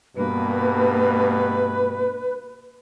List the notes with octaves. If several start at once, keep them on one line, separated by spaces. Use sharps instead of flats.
G2 B2 A#3 B4